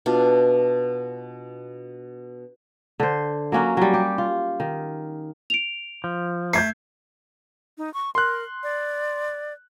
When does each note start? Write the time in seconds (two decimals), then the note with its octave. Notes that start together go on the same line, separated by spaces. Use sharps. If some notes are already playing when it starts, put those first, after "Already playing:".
0.06 B2 D4 F4
3.00 D3 C5
3.52 F#3 A#3 C#4 F#4
3.77 F#3 G3
3.94 G4
4.18 F4
4.60 D#3
5.50 D7 F7
6.04 F3
6.53 A3 G6 G#6 C7
7.78 D#4
7.94 C#6
8.15 A#4 C6 F#6
8.63 D5